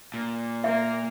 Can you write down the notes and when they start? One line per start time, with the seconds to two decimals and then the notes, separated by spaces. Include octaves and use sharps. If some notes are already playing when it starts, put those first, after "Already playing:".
0.14 A#2
0.64 A#3 E5